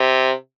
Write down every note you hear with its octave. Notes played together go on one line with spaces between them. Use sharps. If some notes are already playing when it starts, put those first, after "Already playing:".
Already playing: C3